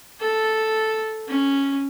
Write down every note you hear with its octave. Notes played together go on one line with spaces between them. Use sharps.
A4
C#4